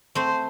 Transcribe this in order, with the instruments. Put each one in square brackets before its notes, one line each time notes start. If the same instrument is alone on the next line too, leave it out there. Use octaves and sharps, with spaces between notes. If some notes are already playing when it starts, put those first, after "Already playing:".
[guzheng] A3 C4 [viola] C5